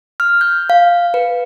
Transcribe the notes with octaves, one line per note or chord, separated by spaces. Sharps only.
F6
G6
F5
B4